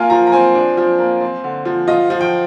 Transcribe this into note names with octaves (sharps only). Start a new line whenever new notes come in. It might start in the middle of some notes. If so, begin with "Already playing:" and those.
Already playing: A#3 F4 G#5
F3 A#5
A#5
C4 G#5
D4
F3
A#3
C4
D3
F3
F4 D#5
F3
G5